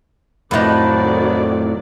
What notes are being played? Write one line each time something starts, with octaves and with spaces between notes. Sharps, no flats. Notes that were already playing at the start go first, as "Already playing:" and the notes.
F2 A2 D#3 F#3 D#4 F4 B4 D5